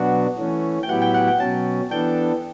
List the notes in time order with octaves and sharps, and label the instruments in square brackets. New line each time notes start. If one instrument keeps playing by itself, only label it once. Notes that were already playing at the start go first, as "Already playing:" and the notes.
Already playing: [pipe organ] B2 F#3 B3 D4 F#4 [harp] F#5
[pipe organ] E3 A3 C#4
[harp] G5
[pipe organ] A2 F#3 B3 E4 G4 [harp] F#5
[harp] G5
F#5
G5
[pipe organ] B2 F#3 C#4 [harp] A5
[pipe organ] E3 B3 D4 A4 [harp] G5